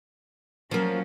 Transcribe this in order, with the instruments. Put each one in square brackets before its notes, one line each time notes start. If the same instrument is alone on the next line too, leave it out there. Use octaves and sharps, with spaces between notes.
[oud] F3 A#3 [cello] F#3 C#4